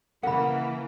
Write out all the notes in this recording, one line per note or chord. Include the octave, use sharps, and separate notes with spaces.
C#3 E3 A#3 A#4 F#5 B5